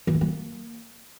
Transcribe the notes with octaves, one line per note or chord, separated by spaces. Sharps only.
E3
A3
G#3
A#3